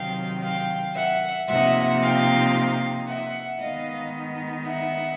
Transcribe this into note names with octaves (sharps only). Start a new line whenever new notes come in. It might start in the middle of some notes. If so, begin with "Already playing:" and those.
Already playing: C3 D#3 F#3 F5 G5
F5 G5
E5 F#5
C3 F3 A#3 D#4 E5 F#5
F5 G5
E5 F#5
D#3 G#3 B3 D#4 D#5 F5
E5 F#5